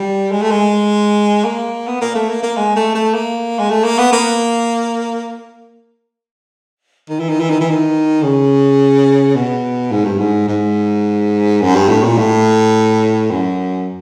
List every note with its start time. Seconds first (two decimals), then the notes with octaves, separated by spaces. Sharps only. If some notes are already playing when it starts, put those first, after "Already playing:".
Already playing: G3
0.31 G#3
0.41 A3
0.51 G#3
1.44 A#3
1.88 B3
2.01 A#3
2.15 A3
2.29 A#3
2.43 A#3
2.57 G#3
2.76 A3
2.95 A3
3.14 A#3
3.59 G#3
3.70 A3
3.84 A#3
3.98 B3
4.12 A#3
7.09 D#3
7.19 E3
7.29 D#3
7.40 E3
7.50 D#3
7.61 E3
7.70 D#3
8.22 C#3
9.35 B2
9.91 G#2
10.04 G2
10.18 G#2
10.48 G#2
11.61 F#2
11.75 G2
11.89 A2
12.04 A#2
12.18 A2
13.31 F#2